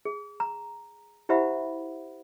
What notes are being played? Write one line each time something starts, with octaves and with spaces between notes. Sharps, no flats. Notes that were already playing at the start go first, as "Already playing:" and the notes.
G#4
A#5
E4 G4 C5 E5 F#5 B5